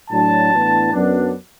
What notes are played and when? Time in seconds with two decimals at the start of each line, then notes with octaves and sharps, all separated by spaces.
0.11 A2 F#3 D4 A5
0.53 A2 E3 B3 D4
0.93 F#2 F#3 B3 D4